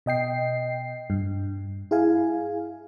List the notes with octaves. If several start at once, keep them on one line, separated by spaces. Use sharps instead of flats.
B2 D#5 G5 C7
G2
E4 G#4 F5 G#5